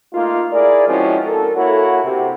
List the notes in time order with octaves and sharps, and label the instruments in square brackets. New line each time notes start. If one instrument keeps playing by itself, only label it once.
[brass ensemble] A3 A#3 D#4 F4
E4 G#4 A#4 D5
F3 G#3 C4 C#4 E4 F#4
A4 A#4
A#3 E4 F#4 A4 C#5 F#5
C3